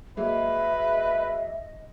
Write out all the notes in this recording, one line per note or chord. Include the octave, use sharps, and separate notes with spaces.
F#3 G#3 A#3 B4 D#5 E5